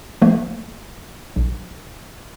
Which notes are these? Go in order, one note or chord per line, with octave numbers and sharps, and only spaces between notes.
F3 A3 A#3
B1